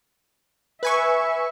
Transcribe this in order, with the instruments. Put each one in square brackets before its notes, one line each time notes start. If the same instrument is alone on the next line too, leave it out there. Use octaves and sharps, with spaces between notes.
[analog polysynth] B4 G#5 C#6 [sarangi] E5